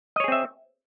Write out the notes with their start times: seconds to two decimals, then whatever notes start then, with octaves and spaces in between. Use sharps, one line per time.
0.16 D#5
0.20 C#5
0.24 G#4
0.28 C4
0.32 E5